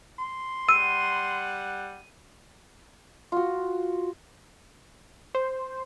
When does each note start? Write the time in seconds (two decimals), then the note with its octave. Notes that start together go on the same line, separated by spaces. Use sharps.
0.19 C6
0.69 G3 F#5 E6 D#7
3.32 F4 F#4
5.35 C5